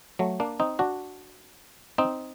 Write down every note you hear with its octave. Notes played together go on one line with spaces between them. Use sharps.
F#3 A3
A#3 D4
C4 D#4
D4 F#4
C4 D#4